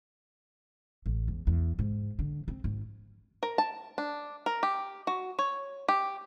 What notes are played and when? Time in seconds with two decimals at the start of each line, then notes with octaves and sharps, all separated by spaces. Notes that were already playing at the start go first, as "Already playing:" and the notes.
1.06 A1
1.28 E2
1.47 E2
1.79 G#2
2.19 D3
2.48 C4
2.64 G#1
3.43 A#4
3.58 A5
3.98 D4
4.46 A#4
4.63 G4
5.07 F#4
5.39 C#5
5.88 G4